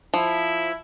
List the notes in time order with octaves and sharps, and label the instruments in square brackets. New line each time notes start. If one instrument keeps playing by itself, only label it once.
[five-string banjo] F3 [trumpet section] E4